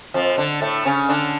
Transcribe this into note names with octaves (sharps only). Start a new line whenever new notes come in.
F2 F3
D3
A2 A3
C#3 C#4
D3 D4